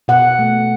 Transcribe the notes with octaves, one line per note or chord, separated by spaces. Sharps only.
B2 F#5
A3